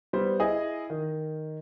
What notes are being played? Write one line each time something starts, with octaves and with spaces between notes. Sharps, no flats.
G3 B3 C5
E4 G#4 D#5
D#3